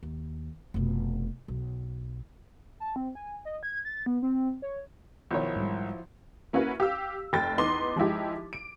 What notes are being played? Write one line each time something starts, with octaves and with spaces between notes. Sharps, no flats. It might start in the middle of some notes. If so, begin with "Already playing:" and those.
D#2
F1 B2
B1
A5
C4
G#5
D#5
G#6
A6
B3
C4
C#5
B1 D#3 F3 E4 C#5
G#2 G3
A#3 C#4 E4 F#4 B4
G4 F5 E6
F1 G5 A6
E2 D#4 B4 C6 D6
F3 G#3 D#4 E4 G4
D7